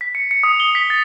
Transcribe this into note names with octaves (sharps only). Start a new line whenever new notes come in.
B6
C#7
C#7
D#6
G7
B6
A6